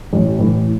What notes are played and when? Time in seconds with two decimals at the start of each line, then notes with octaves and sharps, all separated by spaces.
0.13 A1
0.38 A2 E3